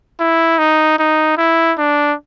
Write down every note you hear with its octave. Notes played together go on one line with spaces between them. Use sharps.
E4
D#4
D#4
E4
D4